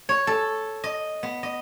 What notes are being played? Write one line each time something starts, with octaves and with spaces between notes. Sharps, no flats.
C#5
A4
D#5
B3
D#5